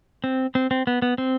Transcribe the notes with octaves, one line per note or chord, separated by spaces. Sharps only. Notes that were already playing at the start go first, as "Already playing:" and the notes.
C4
C4
C4
B3
B3
C4